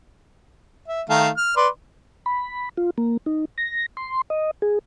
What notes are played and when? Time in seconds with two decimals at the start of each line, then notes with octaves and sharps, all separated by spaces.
0.88 E5
1.09 D#3 A3 F5
1.37 F6
1.57 B4 D5 C6
2.26 B5
2.77 F4
2.98 A#3
3.26 D#4
3.58 A#6
3.97 C6
4.30 D#5
4.62 G#4